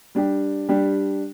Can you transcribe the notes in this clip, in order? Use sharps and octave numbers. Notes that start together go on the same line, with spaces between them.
G3 D4 G4
G3 D4 G4